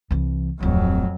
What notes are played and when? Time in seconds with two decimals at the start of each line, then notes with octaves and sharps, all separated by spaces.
0.11 C2 E3
0.60 D1 F2 F#3 A3